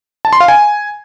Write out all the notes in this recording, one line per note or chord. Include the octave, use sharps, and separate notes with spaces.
A5
C6
F5
G#5